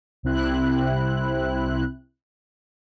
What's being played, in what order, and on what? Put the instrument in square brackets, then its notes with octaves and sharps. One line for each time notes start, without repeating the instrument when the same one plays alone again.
[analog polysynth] C2 C3 C4 E4 F#6